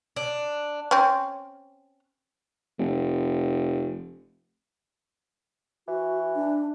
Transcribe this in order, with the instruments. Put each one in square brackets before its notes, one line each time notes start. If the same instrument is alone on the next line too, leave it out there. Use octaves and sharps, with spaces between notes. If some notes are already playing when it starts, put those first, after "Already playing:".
[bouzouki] D4
[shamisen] C4 C#4
[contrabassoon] F1
[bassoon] E3 [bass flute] F#4
[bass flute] D4